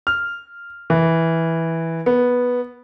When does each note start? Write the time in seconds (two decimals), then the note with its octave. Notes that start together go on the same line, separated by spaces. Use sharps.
0.07 F6
0.90 E3
2.06 B3